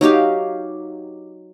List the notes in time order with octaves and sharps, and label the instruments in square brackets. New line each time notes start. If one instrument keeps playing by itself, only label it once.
[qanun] F#3 D#4 G4 F5